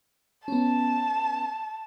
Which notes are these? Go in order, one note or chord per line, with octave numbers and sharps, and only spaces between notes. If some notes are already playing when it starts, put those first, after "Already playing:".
B3 C#4 A5